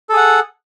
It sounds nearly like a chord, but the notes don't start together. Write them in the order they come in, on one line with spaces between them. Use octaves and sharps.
A4 G#4 F#5